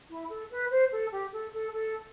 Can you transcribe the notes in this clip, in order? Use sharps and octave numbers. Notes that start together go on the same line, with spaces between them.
E4
A4
B4
C5
A4
G4
A4
A4
A4